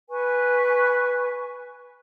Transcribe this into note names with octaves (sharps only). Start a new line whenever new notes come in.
B4 G#5 C#6